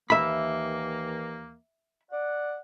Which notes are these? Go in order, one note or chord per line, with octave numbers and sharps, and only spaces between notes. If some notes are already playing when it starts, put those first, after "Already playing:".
D#2 E3 A#3 E5 B5
D5 F#5